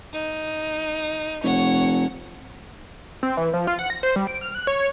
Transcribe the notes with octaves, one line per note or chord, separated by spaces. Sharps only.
D#4
F1 C#5 F#5
C4
E3
F3
F4
F#5
A#6
C5
G3
D7
F6
F#6
C#5